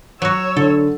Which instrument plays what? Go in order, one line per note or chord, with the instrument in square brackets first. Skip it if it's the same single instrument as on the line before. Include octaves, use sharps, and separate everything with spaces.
[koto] F#3 F#4 [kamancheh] C#5 E6
[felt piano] D3 [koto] A4